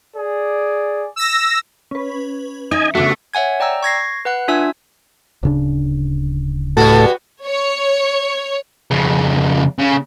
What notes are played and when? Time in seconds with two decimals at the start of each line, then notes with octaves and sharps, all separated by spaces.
0.15 G#4 D5
1.16 E6 A#6
1.91 C#4 B4
2.71 D#4 D#5 E5 G#5
2.95 C#3 A3 B3 D4 F#4 E5 D6
3.34 C#5 E5 F#5 G#5 G#6
3.60 D5 G5 A#5 E6
3.83 C#6 G#6 A#6 C7
4.25 B4 F#5 F#6
4.48 D4 F4 E5 G#5 E6 G#6
5.43 D1 C#3 D4
6.77 A2 G3 B3 F#4 A4 A5
7.45 C#5
8.91 F2 C#3
9.79 C#3